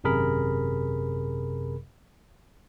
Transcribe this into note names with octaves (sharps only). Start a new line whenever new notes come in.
G#1 F#2 C3 G#4 A#4 B5